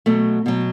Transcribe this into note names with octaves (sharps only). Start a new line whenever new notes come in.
B2 F#3 A3
B2 F#3